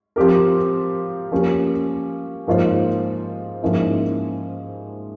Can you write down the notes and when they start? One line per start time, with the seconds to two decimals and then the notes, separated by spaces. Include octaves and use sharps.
0.16 F3 C4 G4 A#4
1.32 F3 A#3 C#4 G4
2.47 G#2 F3 A#3 F4 C5
3.62 G#2 F3 A#3 C#4 E4